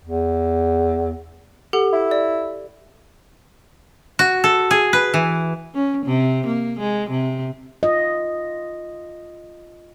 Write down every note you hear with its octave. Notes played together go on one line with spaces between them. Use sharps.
E2
G4 A4 F#5
E4
D5
F#4
A4
G#4
B4
E3
C#4
C3
A#3
G#3
C3
F4 D#5